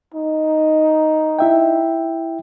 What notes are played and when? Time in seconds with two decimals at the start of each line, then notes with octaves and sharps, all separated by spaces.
0.14 D#4
1.39 E4 E5 G5